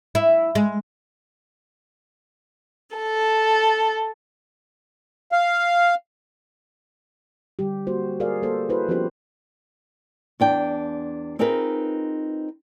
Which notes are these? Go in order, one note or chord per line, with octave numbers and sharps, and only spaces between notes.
E4
G#3
A4
F5
D3 G3 G4
A#3 F#4 C5
F#4 G#4 A#4 D5 F5
A#3 A4 C5
E4 F#4 B4 C5
F3 B3 C#4 F4 G4 C5
E2 D4 G5
C4 D#4 F4 G#4 A#4 B4